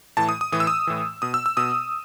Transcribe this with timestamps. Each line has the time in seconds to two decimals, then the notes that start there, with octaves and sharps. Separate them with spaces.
0.17 A2 E3 A5
0.29 D#6
0.41 D#6
0.52 A2 E3 D#6
0.60 E6
0.67 D#6
0.87 A2 E3
1.22 B2 D#6
1.34 E6
1.46 E6
1.57 B2 D#6